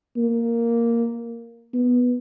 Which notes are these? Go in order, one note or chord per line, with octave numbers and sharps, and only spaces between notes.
A#3
B3